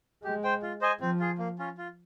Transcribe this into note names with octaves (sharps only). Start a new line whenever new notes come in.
G#3 G4
C5 G5
F4
C5 D#5 G#5
F3 C4
F4 G#4
A#3
C#4 F4
F4